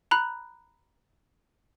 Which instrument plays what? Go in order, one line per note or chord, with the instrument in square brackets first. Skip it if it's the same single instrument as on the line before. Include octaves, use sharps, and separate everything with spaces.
[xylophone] A#5 B5 F#6